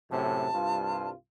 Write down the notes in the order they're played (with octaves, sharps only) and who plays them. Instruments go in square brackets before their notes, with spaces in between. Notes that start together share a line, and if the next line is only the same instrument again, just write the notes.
[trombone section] F#2 A2 C3 [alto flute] A5
[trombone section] C2 G2 F4